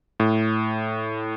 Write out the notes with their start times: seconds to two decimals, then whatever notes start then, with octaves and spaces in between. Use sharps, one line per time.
0.20 A2